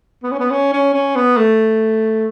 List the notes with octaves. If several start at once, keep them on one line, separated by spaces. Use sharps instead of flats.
B3
C#4
B3
C#4
C#4
C#4
B3
A3